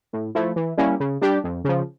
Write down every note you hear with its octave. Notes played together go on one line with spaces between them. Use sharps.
A2
F3 A3 E4
E3
G3 A#3 C#4 E4
C#3
G3 D4 G4
F2
C#3 F3